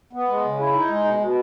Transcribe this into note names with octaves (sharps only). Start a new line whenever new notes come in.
B3
G#3
C#3
E4
D#4
G#3
B2
B2